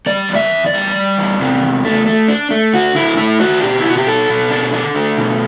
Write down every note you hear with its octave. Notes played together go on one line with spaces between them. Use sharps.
G3 D5
E2
E5
E2
D5
G3
G3
E2
C3
E2
A3
A3
D4
A3
D3 F#4
D3 E4
A3 E4
D4 F#4
B2 G4
E4
B2 F#4
G4
B2 A4
B2
D4
D4
A3
B2